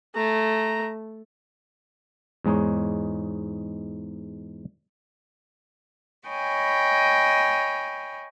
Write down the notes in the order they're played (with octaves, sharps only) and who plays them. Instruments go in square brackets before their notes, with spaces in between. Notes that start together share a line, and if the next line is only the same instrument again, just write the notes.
[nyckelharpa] A3 [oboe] A#5
[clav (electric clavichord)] E2 G#2 G#3 D#4 C#5
[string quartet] C#5 D#5 G5 G#5 B5